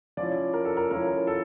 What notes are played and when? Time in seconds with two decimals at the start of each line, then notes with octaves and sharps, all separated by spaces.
0.17 F3 C#4 E4 D5
0.54 A#4
0.65 A4
0.77 A#4
0.91 F3 C#4 E4 A#4
1.27 A4